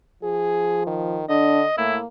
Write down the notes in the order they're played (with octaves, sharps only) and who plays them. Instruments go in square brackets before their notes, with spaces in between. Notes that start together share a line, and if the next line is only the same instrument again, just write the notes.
[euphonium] F3 [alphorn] G#4
[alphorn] D#3
[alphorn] D3 [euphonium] D4 [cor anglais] D#5
[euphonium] A2 [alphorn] A#3 [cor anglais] E4